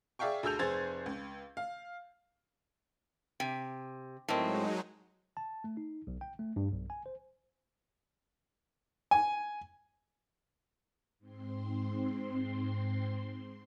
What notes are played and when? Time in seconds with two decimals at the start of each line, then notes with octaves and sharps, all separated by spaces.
0.19 G#4 D5 E5 F5 G5 C#6
0.43 D2 G#4 A4 E6 G6 F7
0.59 F1 G#4 C5 G#5 G#6 A6
1.06 C#2
1.57 F5
3.40 C3 G5
4.28 A2 F#3 G#3 C4 D#4 A#4 D#5 A5
5.37 A5
5.64 A3
5.77 D#4
6.07 B1
6.21 G5
6.39 A3
6.56 G2
6.72 B1
6.90 G#5
7.06 C5
9.11 G#5
11.18 G#2 C4 C6